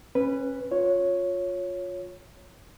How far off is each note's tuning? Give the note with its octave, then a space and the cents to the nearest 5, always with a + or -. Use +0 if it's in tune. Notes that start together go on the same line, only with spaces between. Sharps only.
C#4 -25 B4 +0
F4 +20 C#5 +0